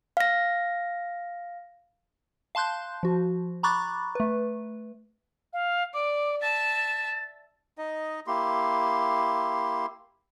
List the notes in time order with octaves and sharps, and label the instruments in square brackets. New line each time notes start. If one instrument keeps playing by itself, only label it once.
[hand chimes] F5 A#6
[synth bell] F5 A5 C6 F#6 G6
F3 F#4
A#5 B5 C#6 D6 F#6 A6
A3 B4
[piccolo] F5
[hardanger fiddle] D5 [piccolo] D6
[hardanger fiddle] E5 A5 [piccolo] A6
[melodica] D#4 D#5
A#3 E4 G4 C6